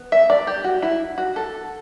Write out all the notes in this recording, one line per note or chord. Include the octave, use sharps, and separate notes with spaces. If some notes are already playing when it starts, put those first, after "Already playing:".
Already playing: B3
E5
D5
G4
F#4
E4
F#4
A4